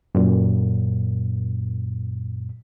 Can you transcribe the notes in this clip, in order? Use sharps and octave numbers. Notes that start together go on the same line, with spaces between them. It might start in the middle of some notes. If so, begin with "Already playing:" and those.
F#2 A#2